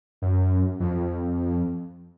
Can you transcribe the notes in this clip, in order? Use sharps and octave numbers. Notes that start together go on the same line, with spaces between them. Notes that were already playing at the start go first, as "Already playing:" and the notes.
F#2
F2